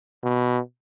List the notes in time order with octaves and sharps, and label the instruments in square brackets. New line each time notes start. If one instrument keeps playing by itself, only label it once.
[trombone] B2